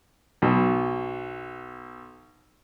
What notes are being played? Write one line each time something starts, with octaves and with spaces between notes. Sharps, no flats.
B1 B2